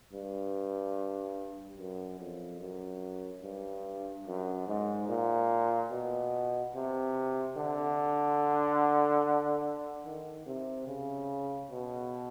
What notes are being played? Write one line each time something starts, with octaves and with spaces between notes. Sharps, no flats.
G2
F#2
F2
F#2
G2
F#2
G#2
A#2
B2
C3
D3
D#3
C3
C#3
B2